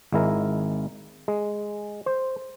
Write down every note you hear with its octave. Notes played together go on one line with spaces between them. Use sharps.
G#1 G#3 E4 A#4
G#3
C5